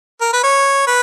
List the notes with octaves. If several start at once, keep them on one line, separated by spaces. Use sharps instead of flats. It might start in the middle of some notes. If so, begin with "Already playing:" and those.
A#4
B4
C#5
B4